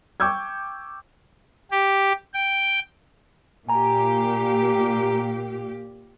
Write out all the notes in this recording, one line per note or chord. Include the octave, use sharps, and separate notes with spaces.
G5 C#6 D6 E6 G6 G#6
G4
G5
A#2 G4 G#5 A#5